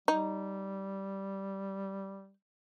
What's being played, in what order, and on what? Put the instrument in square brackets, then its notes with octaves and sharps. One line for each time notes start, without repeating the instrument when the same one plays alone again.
[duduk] G3 [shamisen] D#4